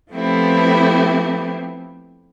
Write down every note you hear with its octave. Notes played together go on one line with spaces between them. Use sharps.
F3 A3 B3 C4 E4 G4